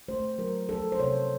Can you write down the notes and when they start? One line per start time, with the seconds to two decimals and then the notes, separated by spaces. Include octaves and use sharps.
0.08 A3 C5
0.38 F#3 A#4
0.69 F3 A4
0.92 C5
1.00 C3 C#5